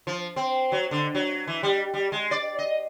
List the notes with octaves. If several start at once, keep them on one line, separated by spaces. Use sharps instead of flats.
F3
C4
F#3
D3
F#3
E3
G3
G3
G#3
D5
D#5